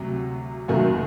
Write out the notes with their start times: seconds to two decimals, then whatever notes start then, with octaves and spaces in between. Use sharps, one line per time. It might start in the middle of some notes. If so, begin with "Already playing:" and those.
Already playing: D2 C3 F#3
0.68 F#1 F#2 D#3 F#3 A3